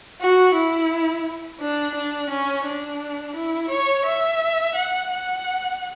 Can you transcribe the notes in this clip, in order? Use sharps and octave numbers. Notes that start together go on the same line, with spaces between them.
F#4
E4
D4
D4
C#4
D4
E4
C#5
E5
F#5
F#5